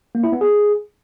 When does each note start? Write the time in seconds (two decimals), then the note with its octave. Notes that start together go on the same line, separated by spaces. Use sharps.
0.15 A#3
0.24 E4
0.32 B3
0.41 G#4